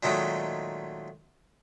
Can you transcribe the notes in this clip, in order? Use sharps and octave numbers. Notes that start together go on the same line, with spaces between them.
A#2 D#3 F#3 G#3 A3